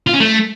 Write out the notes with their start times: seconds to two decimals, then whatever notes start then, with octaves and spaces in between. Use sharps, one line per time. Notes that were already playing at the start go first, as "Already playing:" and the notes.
0.07 F4
0.13 C#4
0.20 A3